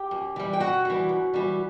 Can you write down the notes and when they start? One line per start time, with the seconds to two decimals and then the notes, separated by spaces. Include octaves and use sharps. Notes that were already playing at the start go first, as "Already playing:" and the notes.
Already playing: G4 G5
0.11 F#2
0.36 E3 G3
0.53 G5
0.60 F#2 F#4 F#5
0.85 E3 G3
1.09 F#2
1.34 E3 G3